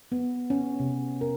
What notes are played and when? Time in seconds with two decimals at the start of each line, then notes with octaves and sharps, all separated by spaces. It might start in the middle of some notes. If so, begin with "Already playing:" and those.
0.12 B3
0.50 C#4
0.80 C3
1.21 A#4